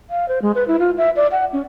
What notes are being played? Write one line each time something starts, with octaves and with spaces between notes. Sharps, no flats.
F5
C5
G#3
B4
E4
F4
E5
D5
F#5
C#4